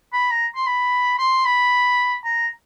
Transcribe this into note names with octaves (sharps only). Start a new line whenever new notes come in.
B5
A#5
C6
B5
C6
B5
A#5